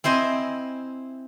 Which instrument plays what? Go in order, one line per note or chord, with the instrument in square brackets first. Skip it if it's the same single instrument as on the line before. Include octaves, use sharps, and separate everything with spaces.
[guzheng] C4 E4 C5 D#5 G#5